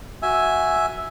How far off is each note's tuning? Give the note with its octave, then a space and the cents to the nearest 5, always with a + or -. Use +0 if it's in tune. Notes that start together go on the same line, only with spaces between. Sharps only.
F#4 +0 E5 +0 G#5 +0